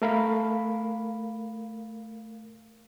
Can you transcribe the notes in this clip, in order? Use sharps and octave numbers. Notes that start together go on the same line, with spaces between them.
A3 A#4 F5 B5